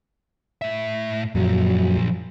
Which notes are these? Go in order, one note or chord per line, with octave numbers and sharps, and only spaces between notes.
A2 E5
F#2 A#2 F3 F#3